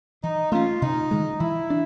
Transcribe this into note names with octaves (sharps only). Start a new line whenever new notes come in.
E3 D#4
A3 C#4 F4
C3 D#4
D#3 G#3
E3 E4
D4